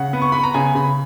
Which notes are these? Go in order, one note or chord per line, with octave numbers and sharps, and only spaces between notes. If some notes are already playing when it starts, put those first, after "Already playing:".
Already playing: C#3 F#5
B3
C#6
B3 B5
A#5
C#3 G#5
C#3 B5